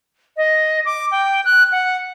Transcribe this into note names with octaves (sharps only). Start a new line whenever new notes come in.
D#5
D6
G5
F#6
F#5